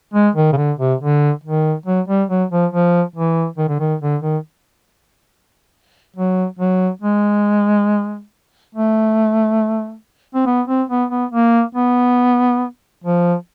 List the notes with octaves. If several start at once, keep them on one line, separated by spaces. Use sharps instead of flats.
G#3
D#3
C#3
D3
C3
D3
D#3
F#3
G3
F#3
F3
F3
E3
D#3
D3
D#3
D3
D#3
F#3
F#3
G#3
A3
C4
B3
C4
B3
B3
A#3
B3
F3